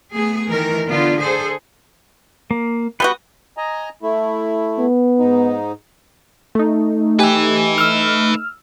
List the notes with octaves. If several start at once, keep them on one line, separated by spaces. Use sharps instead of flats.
A3 B3 G#4
D#3 E3 A3 A#4
D3 B3 D4 F4
G#4 A4 C5
A#3
G3 B3 F#4 B4 G5
D#5 G#5 A#5
A3 E4
B3
G#2 D#4
A3 D#4
G4 B4 E5 G#5
E6 F6